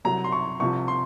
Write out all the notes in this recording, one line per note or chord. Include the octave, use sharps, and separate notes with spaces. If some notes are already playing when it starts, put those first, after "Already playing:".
C2 C3 F#3 A#5
C6
C#6
C2 C3 F3 C#6
C6